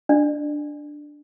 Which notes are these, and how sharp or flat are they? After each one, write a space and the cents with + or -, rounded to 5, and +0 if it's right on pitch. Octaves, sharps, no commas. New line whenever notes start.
D4 +0 D5 +40